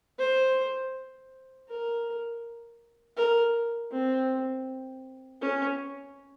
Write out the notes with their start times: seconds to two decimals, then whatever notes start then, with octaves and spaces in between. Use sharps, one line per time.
0.19 C5
1.68 A#4
3.17 A#4
3.91 C4
5.41 C#4